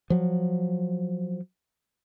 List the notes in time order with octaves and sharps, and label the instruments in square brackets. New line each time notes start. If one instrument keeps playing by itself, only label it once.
[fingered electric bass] F3 F#3